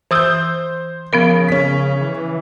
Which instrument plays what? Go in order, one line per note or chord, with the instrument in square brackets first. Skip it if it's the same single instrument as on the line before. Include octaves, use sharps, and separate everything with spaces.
[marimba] E3 D#6 E6 [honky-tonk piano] C5 G6
[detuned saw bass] C#3 [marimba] F3 B3 A#4
[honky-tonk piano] C#4 B6
[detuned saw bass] E3